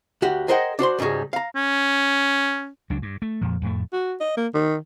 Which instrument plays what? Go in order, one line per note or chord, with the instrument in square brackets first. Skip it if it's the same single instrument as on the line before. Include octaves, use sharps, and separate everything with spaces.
[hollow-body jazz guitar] D2 F#4 G4 F#5
G#4 A#4 C5 D#5 F#5 G5
D4 F#4 C5 C6
C#2 G#2 G3 F#4 G#4
F5 A#5
[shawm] C#4
[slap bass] C#2 F#3 D4
G2
A3
F2 A#2 F3
F2 A2 A3
[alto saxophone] F#4
D#5
A#3
D#3